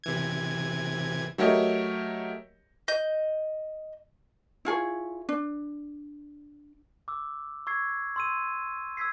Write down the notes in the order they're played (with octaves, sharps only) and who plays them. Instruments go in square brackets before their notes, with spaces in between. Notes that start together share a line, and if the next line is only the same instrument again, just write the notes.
[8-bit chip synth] C3 E3 G#6
[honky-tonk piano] F#3 A3 G4 A#4 C#5 D#5
[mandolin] D#5 G6
[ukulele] E4 F4 G#4 C#5
D4
[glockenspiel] D6 E6
C#6 E6 G#6 C7
C6 E6 D#7
E6 G#6 B6 C7